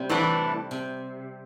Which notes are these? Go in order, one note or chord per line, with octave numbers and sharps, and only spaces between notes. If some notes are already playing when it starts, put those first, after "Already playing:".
Already playing: C3 G3 C4
A2 E3 A3 D4
C3